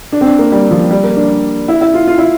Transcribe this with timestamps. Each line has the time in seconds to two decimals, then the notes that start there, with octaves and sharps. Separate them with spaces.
0.12 D4
0.21 C4
0.26 D4
0.39 A#3
0.52 G3
0.71 F3
0.91 G3
1.04 A#3
1.17 D4
1.68 E4
1.81 E4
1.94 F4
2.08 F4
2.18 E4